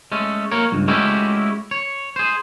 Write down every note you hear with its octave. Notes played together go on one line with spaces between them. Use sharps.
G#3 A3 C#4
A#3 A#4 C#5
C#2 G2
G#3 A3 C#4 E4 F#4 G4
C#5
G#4 C5